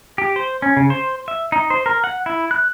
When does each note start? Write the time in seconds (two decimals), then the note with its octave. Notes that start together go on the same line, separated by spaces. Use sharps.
0.18 G4
0.36 C5
0.62 C#4
0.77 C#3
0.90 C5
1.28 E5
1.52 D#4
1.70 C5
1.86 A#4
2.04 F#5
2.26 E4
2.51 F#6